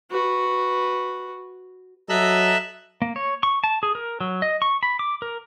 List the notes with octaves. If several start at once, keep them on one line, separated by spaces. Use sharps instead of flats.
F#4 B4
F#3 A4 D#5 E5 A#5 E6 F#6
A#3
C#5
C#6
A5
G#4
A#4
F#3
D#5
C#6
B5
D6
A#4